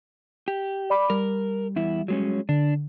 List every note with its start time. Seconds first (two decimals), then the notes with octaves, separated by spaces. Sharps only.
0.48 G4
0.90 D5 B5 D6
1.10 G3 A#4
1.76 E2 E4
2.08 F#3 G#3 C#4
2.49 D3 D4